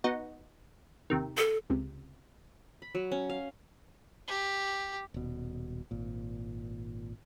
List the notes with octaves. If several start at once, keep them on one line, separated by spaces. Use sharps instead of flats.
B3 D#4 F#4
D#2 C3 D#3
A4
C#2 C3
B5
F#3
C#4
F5
G4
D#1 B2
G#1 A#2